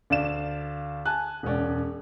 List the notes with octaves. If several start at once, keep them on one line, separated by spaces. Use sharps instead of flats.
D2 D5 F5 E7
G#5 A5 F#6
E1 C#2 C#4 D5